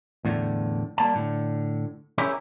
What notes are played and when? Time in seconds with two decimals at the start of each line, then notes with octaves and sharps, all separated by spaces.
0.25 E2 A2 D3
0.98 G3 A#3 A5
1.15 A2 D3
2.18 C#4 E4 G4 G#4 A#4